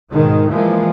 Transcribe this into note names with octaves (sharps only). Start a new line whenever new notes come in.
G#2 B2 D#3 G#3
E3 F3 G#3 A#3